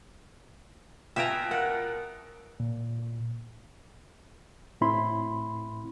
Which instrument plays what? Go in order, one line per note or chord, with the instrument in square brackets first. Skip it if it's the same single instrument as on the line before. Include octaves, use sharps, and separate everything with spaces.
[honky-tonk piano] B2 F4 [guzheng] E5 G#5 A#5 [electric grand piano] G5 D7
[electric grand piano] A#4 [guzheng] F#5
[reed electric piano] A#2
A2 C4 E4 B5 C6